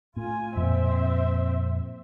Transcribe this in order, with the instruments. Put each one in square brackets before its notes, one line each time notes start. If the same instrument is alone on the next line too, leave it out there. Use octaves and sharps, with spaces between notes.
[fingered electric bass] A2 [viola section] F4 G#5
[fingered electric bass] F2 A#2 [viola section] C4 C5 E5